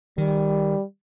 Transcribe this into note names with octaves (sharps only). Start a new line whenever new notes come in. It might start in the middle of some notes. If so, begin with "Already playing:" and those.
D#3 G3